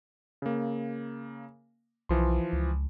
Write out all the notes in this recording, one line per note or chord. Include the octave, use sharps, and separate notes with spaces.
C#3 A#3
B1 E3 F3 C6
C#2